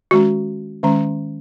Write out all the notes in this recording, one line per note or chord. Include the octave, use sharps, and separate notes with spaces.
D#3 G#3 C#4 F#4
D#3 G#3 C#4